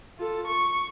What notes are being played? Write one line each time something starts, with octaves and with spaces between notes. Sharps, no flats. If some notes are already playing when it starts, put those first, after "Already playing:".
F4 A4
C#6